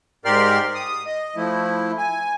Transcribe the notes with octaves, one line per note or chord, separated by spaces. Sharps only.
G#2 G4 A#4 D5 C6 F6
D#6
D#5
F3 A3 E4
G#5